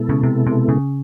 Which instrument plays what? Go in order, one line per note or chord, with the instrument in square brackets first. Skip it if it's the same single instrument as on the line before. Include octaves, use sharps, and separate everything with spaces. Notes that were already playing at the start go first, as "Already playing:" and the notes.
Already playing: [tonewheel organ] B2 G#3 B3 E4 A4
[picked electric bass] C#3
C3
C3
C#3